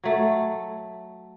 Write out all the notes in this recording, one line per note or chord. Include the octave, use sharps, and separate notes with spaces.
F#3 A3